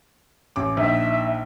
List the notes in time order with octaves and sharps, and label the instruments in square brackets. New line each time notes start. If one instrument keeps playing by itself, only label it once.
[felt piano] A1 D6
[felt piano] A#1 D#4 [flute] E5